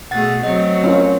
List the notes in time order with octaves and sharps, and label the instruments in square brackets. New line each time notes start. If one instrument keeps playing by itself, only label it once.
[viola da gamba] B2 A3 G#4 [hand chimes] F#5 A6
[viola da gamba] F#3 A3 C4 [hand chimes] D#5
[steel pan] C#4 F4 A#4